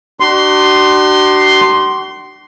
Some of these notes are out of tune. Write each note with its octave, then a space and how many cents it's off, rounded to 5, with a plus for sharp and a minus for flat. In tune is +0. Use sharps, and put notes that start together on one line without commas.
D4 +35 F#4 +45 C6 +0